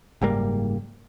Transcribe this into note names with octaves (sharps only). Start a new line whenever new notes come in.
F#1 G#2 G3 A#3